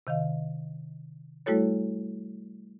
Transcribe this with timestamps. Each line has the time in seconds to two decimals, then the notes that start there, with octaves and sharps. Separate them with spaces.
0.07 C3 D#3 D#5 F5
1.46 G3 A3 E4 F#4 A4 C#5